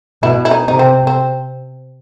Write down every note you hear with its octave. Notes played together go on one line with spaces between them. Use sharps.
B2 E4
E4
D#4
C3 D#4
C4
C4